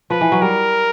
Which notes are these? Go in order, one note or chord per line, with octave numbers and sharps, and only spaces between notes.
F3 B4
E3
F#3
G3 A#4